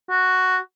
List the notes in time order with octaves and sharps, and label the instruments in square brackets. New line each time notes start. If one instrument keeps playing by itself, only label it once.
[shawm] F#4